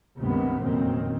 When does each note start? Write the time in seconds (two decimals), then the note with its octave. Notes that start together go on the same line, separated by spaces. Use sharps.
0.18 C#2 G2 C3 D#3 A#3 B3
0.62 F1 F#2 A#2 D#3 C4